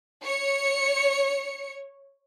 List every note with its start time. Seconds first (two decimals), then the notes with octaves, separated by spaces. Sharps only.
0.23 C#5 C#7